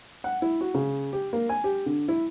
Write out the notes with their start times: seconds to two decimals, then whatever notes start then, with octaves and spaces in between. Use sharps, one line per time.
0.24 F#5
0.42 E4
0.61 F#4
0.74 C#3
1.13 G4
1.33 A#3
1.49 G#5
1.64 G4
1.86 D3
2.08 E4